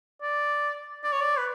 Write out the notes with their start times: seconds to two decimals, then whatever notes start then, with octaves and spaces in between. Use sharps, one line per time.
0.22 D5
1.04 D5
1.12 C#5
1.21 D5
1.37 B4